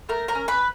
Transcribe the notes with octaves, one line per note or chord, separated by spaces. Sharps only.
A3 A#4 A#5
A#4 A#5
C#4
B4 B5